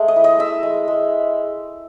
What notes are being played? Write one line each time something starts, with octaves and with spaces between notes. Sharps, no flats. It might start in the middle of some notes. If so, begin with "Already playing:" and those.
Already playing: G#3 A3
D#5
E4
D#5
G#3 E5
G#3
G#3